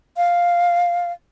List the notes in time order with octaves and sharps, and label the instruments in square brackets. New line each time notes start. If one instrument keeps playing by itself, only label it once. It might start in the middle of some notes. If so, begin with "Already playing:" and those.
[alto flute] F5